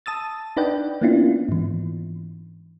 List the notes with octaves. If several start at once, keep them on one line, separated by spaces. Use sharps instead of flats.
A5 D#6 E6 A6
D4 D#4 B4 D5 F#5 G5
A#3 B3 C#4 D4 E4 F4
G#2 E3